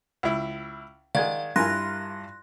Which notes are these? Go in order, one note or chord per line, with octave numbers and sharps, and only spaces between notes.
C#2 E4
D#3 G#3 D5 F5 F#5 G#6
G2 E4 F4 A#4 G#5 C6 F#6 A#6